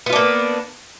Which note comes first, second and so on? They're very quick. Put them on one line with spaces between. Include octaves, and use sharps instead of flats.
B3 F4 D4 A#3